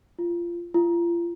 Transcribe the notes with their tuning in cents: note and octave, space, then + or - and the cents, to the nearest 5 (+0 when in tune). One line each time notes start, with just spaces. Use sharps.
F4 -20
F4 -35